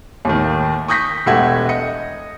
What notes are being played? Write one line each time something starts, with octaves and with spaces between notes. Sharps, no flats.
D#2 A2 D#3
C#6 D#6 G6 A#6 B6
E1 A3 G4 E5 F#5 G#6
D#5 C#7